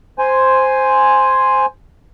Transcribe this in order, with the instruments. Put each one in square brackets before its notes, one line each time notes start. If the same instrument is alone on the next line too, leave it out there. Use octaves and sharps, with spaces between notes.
[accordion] C5 G#5